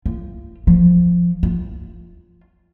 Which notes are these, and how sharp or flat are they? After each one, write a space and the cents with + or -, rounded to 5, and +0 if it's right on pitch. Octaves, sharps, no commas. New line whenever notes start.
F4 -30
F3 +0
F4 -10